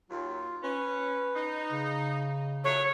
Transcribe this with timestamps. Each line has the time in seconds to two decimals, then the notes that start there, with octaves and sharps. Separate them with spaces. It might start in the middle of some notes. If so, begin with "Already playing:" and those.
0.10 D#2 F#3 F4
0.63 C#4 B4
1.36 D#4
1.72 C#3
2.64 A#2 F#3 A3 C#5